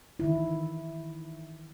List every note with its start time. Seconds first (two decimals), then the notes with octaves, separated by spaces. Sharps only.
0.20 D#3 E3 E4